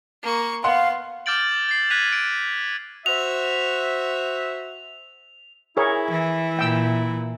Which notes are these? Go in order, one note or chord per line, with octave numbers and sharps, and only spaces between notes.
A#3 C#6
B3 F5 F#5 C6
D6 F6 G6 A6 D7 F#7
A6 C7
F#6 G#6 B6 D#7 F7
D7
F#4 C5 E5 F7
E4 G#4 A#4 C#5
E3
A#2 G5 E6